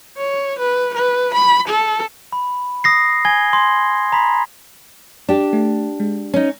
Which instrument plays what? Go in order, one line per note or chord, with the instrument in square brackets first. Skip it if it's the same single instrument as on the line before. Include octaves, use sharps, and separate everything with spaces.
[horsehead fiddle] C#5
B4
B4
B5
A4
[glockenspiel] B5
D#6 A#6 C7
G#5 G#6 G7
C6
A#5 B5 B6
[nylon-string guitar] D4 G4
[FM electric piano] A3
G#3
[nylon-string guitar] C#4 D#4